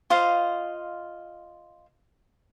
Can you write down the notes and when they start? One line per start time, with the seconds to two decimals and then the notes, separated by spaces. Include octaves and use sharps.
0.10 F4 C5 D#5 F5